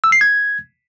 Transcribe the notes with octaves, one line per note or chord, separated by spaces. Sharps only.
E6
C7
G#6